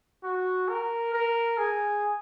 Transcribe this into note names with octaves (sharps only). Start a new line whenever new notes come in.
F#4
A#4
A#4
G#4